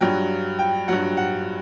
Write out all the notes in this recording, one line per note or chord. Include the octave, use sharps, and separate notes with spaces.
G2 F#3 G5
G5
G2 F#3 F#5
F#5